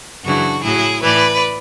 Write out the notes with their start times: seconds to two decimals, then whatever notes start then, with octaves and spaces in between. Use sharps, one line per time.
0.23 F#2 C#3 E3 D4 F#4
0.63 A2 F#3 E4 G#4
1.02 A2 E3 B4 D5